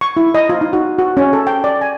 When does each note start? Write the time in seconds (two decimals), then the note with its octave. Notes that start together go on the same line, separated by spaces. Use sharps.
0.01 C#6
0.17 E4
0.34 D#5
0.49 F4
0.61 D#4
0.73 F#4
0.98 F#4
1.17 C#4
1.33 A4
1.47 G5
1.64 D5
1.81 G#5